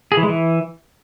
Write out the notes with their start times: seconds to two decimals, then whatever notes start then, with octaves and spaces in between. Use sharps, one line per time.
0.12 G#4
0.17 E3
0.23 G#3
0.28 E3